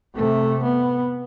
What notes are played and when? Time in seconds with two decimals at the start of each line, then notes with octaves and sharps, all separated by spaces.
0.15 C3 A3
0.63 B3